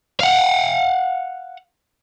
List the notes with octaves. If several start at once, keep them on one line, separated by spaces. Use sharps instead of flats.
F5 F#5